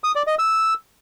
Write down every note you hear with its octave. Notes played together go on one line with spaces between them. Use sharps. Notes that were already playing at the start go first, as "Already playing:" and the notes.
D#6
D5
D#5
E6